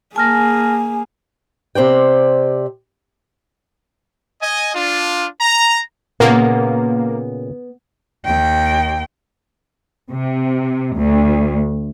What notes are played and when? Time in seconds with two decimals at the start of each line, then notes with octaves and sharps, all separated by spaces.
0.16 A#3 G#4 G#5 A5 F6 A#6
1.75 C3 C5 D5 G5
4.41 D#5 G#5
4.74 D4 F4
5.40 A#5
6.20 A#2 C#3 A#3 B3
8.25 D#2 G5
10.10 C3
10.94 D2